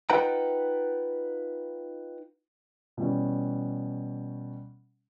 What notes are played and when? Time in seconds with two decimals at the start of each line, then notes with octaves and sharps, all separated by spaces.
0.10 D#4 F4 B4 F#5 G5 A#5
2.97 B2 E3 G3 C#4